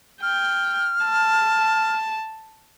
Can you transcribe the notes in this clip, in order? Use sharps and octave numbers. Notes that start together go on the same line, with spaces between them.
G5 F6
A5